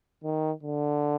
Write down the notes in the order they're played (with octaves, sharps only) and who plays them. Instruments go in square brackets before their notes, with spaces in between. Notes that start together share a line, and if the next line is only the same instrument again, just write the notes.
[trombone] D#3
D3